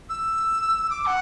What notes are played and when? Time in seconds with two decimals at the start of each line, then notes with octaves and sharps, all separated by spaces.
0.09 E6
0.90 D6
1.06 F#5